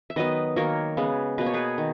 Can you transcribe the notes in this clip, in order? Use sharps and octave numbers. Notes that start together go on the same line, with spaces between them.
E5
D#3 F#3 B3 B4 D#5
D#3 F#3 A#3 A#4 C#5
C#3 G#3 B3
B2 A#3 B4
C#5
G#4 B4
D#3